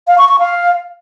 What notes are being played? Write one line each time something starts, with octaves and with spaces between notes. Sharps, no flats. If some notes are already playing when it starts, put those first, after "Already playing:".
F5
C#6
C#6
F5